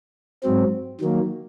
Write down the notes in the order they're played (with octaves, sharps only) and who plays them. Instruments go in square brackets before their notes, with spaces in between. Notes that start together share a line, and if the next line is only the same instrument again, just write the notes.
[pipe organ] G#2 F#3 C4
D#3 F#3 A#3